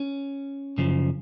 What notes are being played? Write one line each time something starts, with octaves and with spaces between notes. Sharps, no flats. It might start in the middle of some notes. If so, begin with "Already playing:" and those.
Already playing: C#4
F#2 C#3 F3